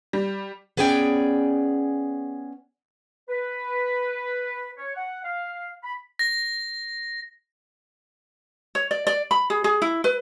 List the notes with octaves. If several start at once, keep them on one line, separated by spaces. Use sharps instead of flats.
G3
B3 C#4 G#4 D5 G5
B4
C#5
F#5
F5
B5
A#6
C#5
D5
D5
B5
G#4
G#4
E4
B4